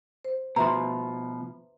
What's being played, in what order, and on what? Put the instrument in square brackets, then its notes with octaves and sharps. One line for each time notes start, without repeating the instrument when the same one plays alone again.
[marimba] C5
[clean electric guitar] B2 F3 [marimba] B4 E5 C6 [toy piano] A#5